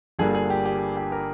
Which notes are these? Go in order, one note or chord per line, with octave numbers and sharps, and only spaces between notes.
G1 G2 D3 G3 A#3 G#4
G#4
G4
G4
G4
A#4